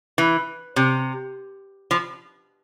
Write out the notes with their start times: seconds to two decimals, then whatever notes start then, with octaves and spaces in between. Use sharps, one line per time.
0.18 E3
0.76 C3
1.91 F3